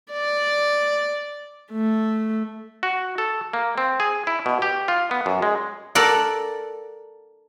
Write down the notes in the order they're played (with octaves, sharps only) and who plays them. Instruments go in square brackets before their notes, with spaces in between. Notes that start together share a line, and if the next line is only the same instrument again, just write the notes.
[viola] D5
A3
[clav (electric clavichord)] F#4
A4
A#3
C4
G#4
E4
B2
G4
F4
B3
F#2
G#3
[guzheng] A4 A#4 D5 F#5